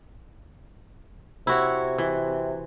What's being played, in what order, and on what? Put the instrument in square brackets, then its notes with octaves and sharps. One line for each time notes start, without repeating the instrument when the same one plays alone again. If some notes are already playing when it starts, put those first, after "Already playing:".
[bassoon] C3 [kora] E4 F#4 C#5
[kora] E3